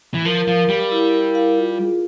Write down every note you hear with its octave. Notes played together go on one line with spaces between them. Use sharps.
E3
F3 A#4
F3 F5
G3 G4
E4
A#4
F5
F4
G#4